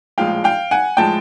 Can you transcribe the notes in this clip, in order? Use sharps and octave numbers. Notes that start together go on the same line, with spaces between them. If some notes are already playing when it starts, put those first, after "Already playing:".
A#1 A2 F3 G#3 F5 G5
F5 G5
F#5 G#5
A2 F3 G#3 G5 A5